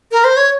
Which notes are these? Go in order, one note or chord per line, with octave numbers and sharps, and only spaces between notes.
A#4
C5
C#5